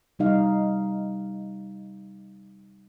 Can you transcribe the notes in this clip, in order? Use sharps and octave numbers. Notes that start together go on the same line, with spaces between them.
C3 G3 D#4 F5